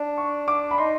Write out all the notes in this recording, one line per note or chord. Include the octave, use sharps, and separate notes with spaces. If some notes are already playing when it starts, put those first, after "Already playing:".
Already playing: D4
C#6
D6
B5
D#4 C6